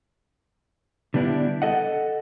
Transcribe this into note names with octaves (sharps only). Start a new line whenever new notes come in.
D3 G3 B3 D4 E4
A4 D#5 F#5